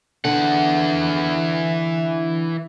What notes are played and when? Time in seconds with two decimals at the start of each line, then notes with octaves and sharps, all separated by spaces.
0.25 D3 E3 F#5